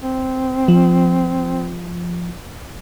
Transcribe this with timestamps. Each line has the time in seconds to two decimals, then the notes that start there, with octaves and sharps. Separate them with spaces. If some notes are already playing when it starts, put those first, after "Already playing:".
0.02 C4
0.68 F3